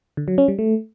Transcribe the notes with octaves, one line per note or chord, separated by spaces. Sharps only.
D3
F#3
C#4
G3
A3